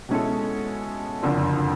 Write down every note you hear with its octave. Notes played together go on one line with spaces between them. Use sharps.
B2 G#3 C#4 E4 A4
F#1 F2 D3